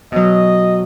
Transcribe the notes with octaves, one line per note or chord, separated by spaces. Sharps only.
B2 F#3 D#5